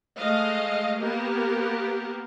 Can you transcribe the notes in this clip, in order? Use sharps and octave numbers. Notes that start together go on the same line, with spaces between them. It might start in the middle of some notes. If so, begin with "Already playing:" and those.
G#3 A3 D#5 F5
A#3 B3 G4 A#4